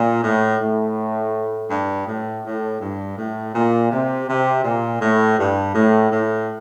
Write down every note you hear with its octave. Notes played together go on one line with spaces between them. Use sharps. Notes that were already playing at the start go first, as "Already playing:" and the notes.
Already playing: A#2
A2
A2
G2
A2
A2
G2
A2
A#2
C3
C3
A#2
A2
G2
A2
A2